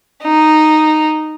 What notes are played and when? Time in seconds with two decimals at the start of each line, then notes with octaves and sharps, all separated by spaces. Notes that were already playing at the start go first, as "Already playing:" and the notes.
0.23 D#4